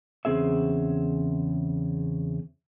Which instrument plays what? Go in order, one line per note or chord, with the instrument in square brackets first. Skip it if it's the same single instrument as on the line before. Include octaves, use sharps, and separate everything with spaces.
[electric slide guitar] E2 C#3 C4 G#4 E5